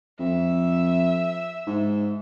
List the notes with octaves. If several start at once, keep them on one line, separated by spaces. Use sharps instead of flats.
F2 E5
G#2